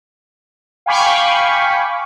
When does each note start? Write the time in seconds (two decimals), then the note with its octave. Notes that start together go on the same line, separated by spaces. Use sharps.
0.86 F5 G5 G#5 B5 C#6 D6